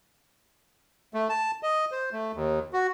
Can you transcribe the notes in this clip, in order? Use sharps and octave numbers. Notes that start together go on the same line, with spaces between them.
A3
A5
D#5
C5
A3
D#2
F#4